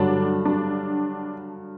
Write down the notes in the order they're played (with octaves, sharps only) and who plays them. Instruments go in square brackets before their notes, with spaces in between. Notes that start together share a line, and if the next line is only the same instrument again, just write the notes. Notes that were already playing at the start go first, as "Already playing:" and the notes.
Already playing: [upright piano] G2 D3 F#3 [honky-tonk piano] D4
[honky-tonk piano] D4